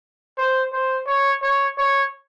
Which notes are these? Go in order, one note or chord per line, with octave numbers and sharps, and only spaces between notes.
C5
C5
C#5
C#5
C#5